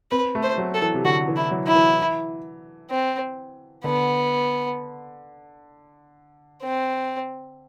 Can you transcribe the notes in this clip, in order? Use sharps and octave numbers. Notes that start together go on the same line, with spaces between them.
C4 B4
A3
C5
F#3
A4
E3
C3
D3 F#4
E3
E4
F#3
E4
E3
C4
D3 B3
C4